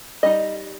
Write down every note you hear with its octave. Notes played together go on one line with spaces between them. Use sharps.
G3 D#4 D#5